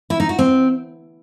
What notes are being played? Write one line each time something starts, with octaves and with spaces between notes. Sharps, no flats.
E4
D#4
F#4
C4